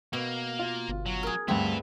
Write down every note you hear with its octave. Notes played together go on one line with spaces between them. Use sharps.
B2 A#3
F4
G1
F#3
G#4 A#4
D2 G2 A3 C4 E4 B4